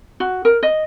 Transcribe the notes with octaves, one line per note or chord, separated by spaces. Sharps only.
F#4
A#4
D#5